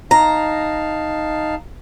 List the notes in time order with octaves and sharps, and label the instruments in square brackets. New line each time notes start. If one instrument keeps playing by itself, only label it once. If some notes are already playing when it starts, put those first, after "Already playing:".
[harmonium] D#4 F5 A5 [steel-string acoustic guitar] A#5